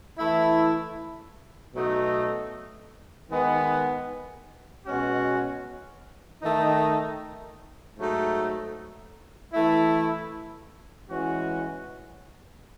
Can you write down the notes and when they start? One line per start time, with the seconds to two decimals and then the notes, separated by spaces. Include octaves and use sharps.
0.18 E3 A3 E4
1.74 B2 F#3 A3 D#4
3.30 D#3 G#3 B3
4.86 B2 G#3 C#4 F#4
6.42 D#3 A3 D#4
7.97 G#2 F#3 A3 D#4
9.53 E3 A3 E4
11.09 E3 G#3 C#4 F#4